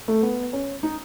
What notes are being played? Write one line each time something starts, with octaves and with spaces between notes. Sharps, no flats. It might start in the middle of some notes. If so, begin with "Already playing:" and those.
A3
B3
C#4
D#4